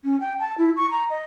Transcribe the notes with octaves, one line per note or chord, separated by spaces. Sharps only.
C#4
G5
A5
E4
C#6
A#5
D#5